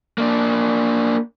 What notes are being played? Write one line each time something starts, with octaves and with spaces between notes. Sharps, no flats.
A#3 D4